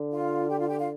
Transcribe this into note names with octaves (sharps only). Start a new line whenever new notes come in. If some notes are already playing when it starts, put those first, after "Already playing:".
Already playing: D3
F4 F5
G4 G5
F4 F5
G4 G5
F4 F5